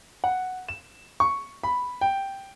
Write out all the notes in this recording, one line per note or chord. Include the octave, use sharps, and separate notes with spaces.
F#5
E7
C#6
B5
G5